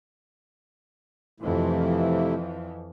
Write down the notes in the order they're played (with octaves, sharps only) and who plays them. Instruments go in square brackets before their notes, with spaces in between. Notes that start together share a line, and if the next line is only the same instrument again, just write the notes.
[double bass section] F2 E3 F3 [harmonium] C3 A3 E4